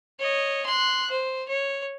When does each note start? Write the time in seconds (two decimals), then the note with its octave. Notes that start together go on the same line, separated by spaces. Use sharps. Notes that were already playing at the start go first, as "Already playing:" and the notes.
0.19 C#5 D#5
0.66 C6 F#6
1.11 C5
1.49 C#5